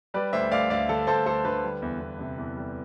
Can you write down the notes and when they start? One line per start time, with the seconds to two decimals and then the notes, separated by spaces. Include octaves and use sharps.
0.14 G3 B4 D5
0.33 D2 C5 E5
0.51 D2 D5 F5
0.70 D2 D5 F5
0.89 D3 A4
1.07 D2 A4 C5
1.26 D2 A4 C5
1.45 D3 B4
1.64 G3
1.82 E2
2.01 E2
2.19 C3
2.38 E2
2.57 G3